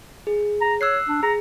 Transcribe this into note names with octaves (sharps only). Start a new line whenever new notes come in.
G#4
A#5
C#5 E6 F#6 C7
D4
G#4 A#5